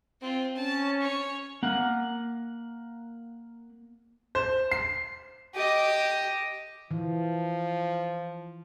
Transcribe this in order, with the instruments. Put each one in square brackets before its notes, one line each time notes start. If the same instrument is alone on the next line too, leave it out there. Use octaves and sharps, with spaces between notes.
[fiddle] C4 F4
[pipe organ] C#4 [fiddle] A5
[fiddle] C#5
[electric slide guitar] A#3 F#5
[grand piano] C5
C7
[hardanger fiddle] G4 D#5
[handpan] E3 [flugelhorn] F3